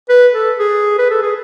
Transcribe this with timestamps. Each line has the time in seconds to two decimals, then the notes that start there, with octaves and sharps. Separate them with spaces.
0.09 B4
0.33 A4
0.59 G#4
0.98 B4
1.10 A4
1.22 G#4